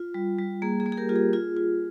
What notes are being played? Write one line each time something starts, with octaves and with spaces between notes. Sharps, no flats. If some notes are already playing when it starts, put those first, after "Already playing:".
Already playing: F4
G3
G3
A#3 G#4
G#4
A#3
G#4
G4 A#4
F4 G4
G#4
F4 G#4
F4